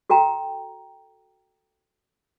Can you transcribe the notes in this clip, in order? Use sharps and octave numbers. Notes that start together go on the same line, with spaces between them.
F#4 A4 G5 A#5